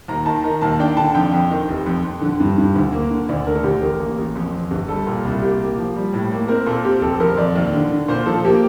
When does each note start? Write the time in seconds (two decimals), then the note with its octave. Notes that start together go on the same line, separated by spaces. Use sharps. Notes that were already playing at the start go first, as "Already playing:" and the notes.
0.08 D#2 A#5
0.26 D#3 A5
0.44 D#3 A#5
0.61 D#2 A5
0.80 D4 G5
0.97 D3 A5
1.15 F2 G5
1.33 F2
1.51 D#3
1.68 F1
1.86 F2
2.05 F2
2.21 D3
2.40 G2
2.58 G2
2.76 D2
2.93 A#3
3.10 D3
3.29 D2 D5
3.47 A3 A#4
3.55 A4
3.64 D2 G4
3.81 A1 A#4
4.00 A#3
4.18 A1
4.35 F2
4.52 F2
4.71 G1
4.88 G3 A4
5.07 A#2
5.25 C2
5.42 A#3 G4
5.60 A#3
5.77 F3
5.96 G3
6.13 A2
6.31 A#3
6.48 C4 A#4
6.66 A#2 A4
6.84 C4 G4
7.02 F1 A4
7.20 F2 A#4
7.37 F2 D5
7.56 D#2
7.74 D3
7.90 D3
8.08 A#2 C5
8.26 F3 A4
8.45 A#3 G4